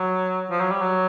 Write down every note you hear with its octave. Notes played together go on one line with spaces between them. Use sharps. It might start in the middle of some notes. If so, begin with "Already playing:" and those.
Already playing: F#3
F3
F#3
G3
F#3